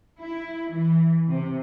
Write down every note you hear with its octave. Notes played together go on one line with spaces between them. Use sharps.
E4
E3
C3